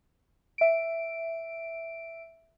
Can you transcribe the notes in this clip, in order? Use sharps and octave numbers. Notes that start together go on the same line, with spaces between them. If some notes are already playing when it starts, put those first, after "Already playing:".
E5 D7